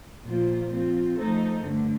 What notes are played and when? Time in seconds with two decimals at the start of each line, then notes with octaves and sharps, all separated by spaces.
0.25 A#2 F3 A#3 F4 C5
0.70 F3 C4 F4
1.17 F3 A3 D#4 A4 C5
1.63 G2 D3 A3